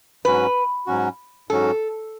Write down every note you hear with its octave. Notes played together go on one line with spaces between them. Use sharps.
G#2 F#3 C#4 F#4 B4
G#2 F#3 C#4 F#4
G#2 F#3 C#4 F#4 A4